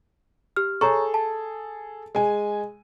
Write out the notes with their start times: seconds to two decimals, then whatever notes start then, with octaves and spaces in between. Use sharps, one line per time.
0.56 G4 F6
0.81 G#4 A4 C#5 A#5 C#6
1.14 A5
2.15 G#3 G#5